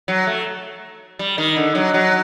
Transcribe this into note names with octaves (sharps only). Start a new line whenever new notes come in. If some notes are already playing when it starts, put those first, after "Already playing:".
F#3
A3
G3
D#3
D3
F#3
F#3